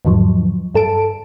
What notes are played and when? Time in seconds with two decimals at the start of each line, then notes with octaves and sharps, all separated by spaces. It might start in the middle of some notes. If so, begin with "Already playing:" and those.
0.05 E2 G#2 D3 F3 F#3
0.75 G2 A4 A5 D7